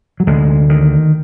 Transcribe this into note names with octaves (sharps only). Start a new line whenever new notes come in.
F#3
D2 D3 G#3
D#3